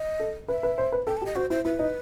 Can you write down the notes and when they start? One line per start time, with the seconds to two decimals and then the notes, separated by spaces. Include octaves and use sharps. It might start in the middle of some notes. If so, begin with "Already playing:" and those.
Already playing: D#5
0.20 A4
0.48 B4 E5
0.63 B4
0.78 C5
0.92 B4
1.07 A4 G5
1.17 A5
1.22 G4
1.26 D#5
1.35 F#4 C5
1.50 E4 C5
1.65 E4 B4
1.79 D#4